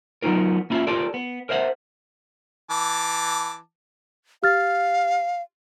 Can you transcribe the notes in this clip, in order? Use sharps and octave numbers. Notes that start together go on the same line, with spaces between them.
F#3 B3 C#4 D#4 F4 A#4
A#3 C#4 E4 F4
F4 G4 A4 A#4 D5
B3
A#4 C5 E5 F#5
E3 A5 D6
G4 F5 F6 A6